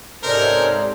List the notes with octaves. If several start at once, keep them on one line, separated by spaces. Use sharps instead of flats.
G#2 C3 C#4 D#4 A4 A#4 C5 D5